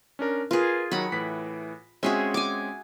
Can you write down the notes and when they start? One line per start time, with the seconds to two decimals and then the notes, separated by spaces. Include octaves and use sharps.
0.19 C#4 D4 A#4
0.51 F4 G#4 A#4 B4
0.91 D#3 F#3 F#5 B5
1.12 A2 E3 B6
2.03 G#3 C4 C#4 F#4 G#4 E5
2.34 G#5 D6